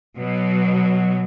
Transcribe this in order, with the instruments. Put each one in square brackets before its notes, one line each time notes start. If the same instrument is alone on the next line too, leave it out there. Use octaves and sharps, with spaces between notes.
[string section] B2 F#3